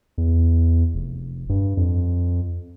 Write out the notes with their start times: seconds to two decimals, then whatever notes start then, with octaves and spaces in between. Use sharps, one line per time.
0.18 E2
0.94 F1
1.49 G2
1.77 F2